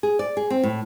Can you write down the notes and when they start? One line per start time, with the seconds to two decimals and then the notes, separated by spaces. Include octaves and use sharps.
0.03 G#4
0.19 D5
0.37 G#4
0.50 C4
0.63 A2